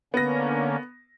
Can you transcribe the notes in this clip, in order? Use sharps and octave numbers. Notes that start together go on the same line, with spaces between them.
D3 A#3 B3 C#4 A#6